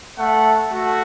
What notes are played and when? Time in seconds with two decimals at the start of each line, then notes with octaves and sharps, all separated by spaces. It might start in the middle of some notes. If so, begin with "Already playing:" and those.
0.18 A3 F#5
0.71 A3 F#4